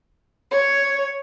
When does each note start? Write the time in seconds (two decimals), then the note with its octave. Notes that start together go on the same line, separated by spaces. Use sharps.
0.50 C#5